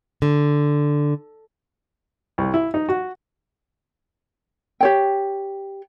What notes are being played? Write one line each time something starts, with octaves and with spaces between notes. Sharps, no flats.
D3
C2
E4
D#4
F#4
G4 C#5 G5